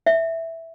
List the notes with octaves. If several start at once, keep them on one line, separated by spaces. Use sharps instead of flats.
E5